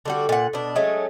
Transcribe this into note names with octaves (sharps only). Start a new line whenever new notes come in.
D3 G3 F#4
A#2 F#5
B2 D4
F#3 G#3 A3 C#4